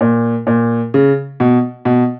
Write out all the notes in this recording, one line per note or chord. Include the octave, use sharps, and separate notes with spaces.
A#2
A#2
C#3
B2
B2